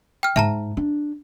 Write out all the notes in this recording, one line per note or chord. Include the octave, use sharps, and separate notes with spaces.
G5 F6
G#2 E5 A5 A#5
D4